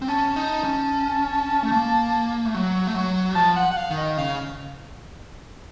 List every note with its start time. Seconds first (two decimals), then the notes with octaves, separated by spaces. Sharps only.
0.02 C4
0.08 C#4 A5
0.36 D#4
0.64 C#4
1.63 A3
1.72 A#3
2.45 A3
2.55 F#3
2.87 A3
2.95 F#3
3.35 F3 A5
3.56 F#5
3.71 F#5
3.77 F5
3.91 D#3
3.97 D#5
4.18 C#3 F5